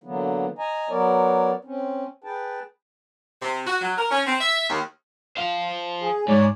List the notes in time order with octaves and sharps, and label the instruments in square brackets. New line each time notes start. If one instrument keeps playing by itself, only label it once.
[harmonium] D3 E3 F#3 A#3 B3
D#5 G#5 A#5
F#3 B3 A#4 C#5 D5
C4 C#4
G#4 B4 G5 A5
[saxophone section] C3
F#4
F#3
A#4
C#4
C4
E5
D#2
[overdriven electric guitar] C5 F5
[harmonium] G#4
[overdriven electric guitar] G#2 [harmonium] C#5 D5